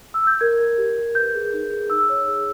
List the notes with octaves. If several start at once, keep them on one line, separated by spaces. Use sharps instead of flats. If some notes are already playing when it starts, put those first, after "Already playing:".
E6
G6
A#4 G#6
A#4
G4
A#4
B4 G6
G#4
D#4
G#4
D#4 E6
C#5
G#4